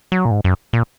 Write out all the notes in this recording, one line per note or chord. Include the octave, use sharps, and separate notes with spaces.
F#3
A#2
G#2
F#2
A#2